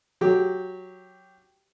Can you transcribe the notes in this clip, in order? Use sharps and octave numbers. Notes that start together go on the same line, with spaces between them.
F#3 G4